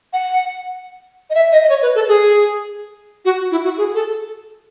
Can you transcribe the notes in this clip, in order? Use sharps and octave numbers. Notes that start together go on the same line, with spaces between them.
F#5
D#5
E5
D#5
D#5
C#5
B4
A4
G#4
F#4
E4
F#4
G#4
A4